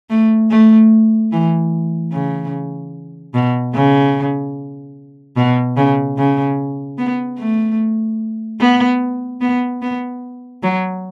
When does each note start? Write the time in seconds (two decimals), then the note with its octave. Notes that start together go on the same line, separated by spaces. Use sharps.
0.10 A3
0.50 A3
1.32 E3
2.13 C#3
3.34 B2
3.75 C#3
5.37 B2
5.77 C#3
6.18 C#3
6.98 B3
7.39 A3
8.61 B3
9.41 B3
9.82 B3
10.63 F#3